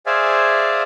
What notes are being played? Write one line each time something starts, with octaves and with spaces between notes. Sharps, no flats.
G#4 C5 D5 E5 F5 G#5